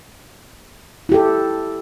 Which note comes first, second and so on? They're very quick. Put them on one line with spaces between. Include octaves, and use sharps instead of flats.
E4 G4 A4